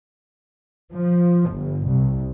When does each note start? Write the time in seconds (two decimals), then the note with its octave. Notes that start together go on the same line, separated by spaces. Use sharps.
0.93 F3
1.51 G1
1.89 C2